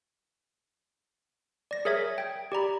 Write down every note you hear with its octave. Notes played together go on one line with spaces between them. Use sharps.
D5 A#6
G#4 A#4 C#5 E5 D#6 G#6
G5 G#6
G4 D5 A#5 B5